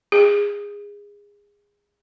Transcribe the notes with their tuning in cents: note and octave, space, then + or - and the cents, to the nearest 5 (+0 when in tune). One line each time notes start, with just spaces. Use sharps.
G#4 -25